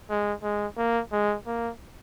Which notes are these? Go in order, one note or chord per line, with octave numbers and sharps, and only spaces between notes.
G#3
G#3
A#3
G#3
A#3